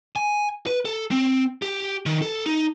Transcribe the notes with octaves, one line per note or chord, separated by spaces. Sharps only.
G#5
B4
A4
C4
G4
D#3
A4
D#4